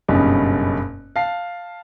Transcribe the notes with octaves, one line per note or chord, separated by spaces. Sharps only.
F#1 G2 B2 B3 C#4 D#4
F5 A5 C7